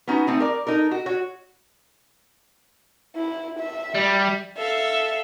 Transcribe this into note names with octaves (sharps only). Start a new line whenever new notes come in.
B3 C#4 D#4 F#4
A3 C4 D#4
A#4 D5
D#4 A4 A#4
F#4
F#4 C#5
E4
E5
G3
A4 E5 F5